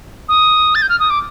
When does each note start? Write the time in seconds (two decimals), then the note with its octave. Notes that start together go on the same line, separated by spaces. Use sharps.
0.29 D#6
0.75 A6
0.82 G6
0.89 F6
1.00 D#6
1.10 D6